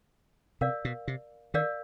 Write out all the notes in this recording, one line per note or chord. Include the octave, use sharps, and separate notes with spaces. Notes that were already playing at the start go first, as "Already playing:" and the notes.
C3 A#4 D5 F5
B2
C3
D#3 A#4 D5 F5